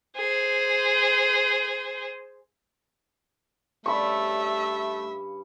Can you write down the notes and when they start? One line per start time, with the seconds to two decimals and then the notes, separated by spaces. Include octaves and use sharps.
0.16 G#4 C5
3.86 G2 C#3 A3 D5 E5 B5 C#6